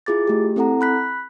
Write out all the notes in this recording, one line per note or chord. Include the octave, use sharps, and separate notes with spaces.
E4 F4 G#4 D6 A6
A3 G4
C4 E4 A4 F#5 A#5
B5 F#6 B6